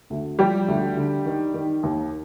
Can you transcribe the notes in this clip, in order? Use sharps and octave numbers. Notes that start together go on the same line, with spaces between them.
D2
F3 G3 G4
D2
D3
D#3
D#3
D#2